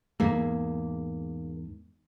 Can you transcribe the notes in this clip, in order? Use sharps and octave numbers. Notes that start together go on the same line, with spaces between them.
E2 G#2 A#3